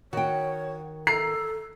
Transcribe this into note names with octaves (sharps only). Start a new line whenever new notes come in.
D#3 F#4 C#5 G5
A4 A#5 C7